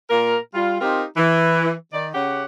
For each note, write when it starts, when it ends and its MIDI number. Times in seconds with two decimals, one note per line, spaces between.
0.10 0.37 46
0.10 0.37 58
0.10 0.37 70
0.54 0.77 55
0.54 0.77 65
0.81 1.04 60
0.81 1.04 63
0.81 1.04 65
0.81 1.04 67
0.81 1.04 70
1.17 1.72 52
1.92 2.08 51
1.92 2.08 74
2.14 2.45 49
2.14 2.45 61
2.14 2.45 67
2.14 2.45 78